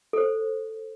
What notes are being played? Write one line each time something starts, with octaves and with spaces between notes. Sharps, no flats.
A4 C5